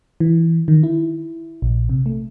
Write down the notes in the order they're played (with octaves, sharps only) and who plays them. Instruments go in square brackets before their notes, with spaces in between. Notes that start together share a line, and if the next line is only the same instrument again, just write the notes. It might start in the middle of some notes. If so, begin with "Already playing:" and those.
[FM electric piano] E3
D#3
E4
A#1
C3
A3